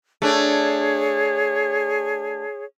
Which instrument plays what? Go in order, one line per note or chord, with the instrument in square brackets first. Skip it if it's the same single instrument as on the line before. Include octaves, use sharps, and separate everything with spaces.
[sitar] A3 D4 [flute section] G#4 C#5